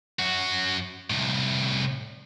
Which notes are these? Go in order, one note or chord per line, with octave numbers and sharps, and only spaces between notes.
F#2 F#4
C2 A2